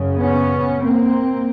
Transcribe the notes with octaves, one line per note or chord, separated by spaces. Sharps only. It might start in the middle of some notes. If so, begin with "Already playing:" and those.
Already playing: F#2 C#3
B3 C#4
A#3 C4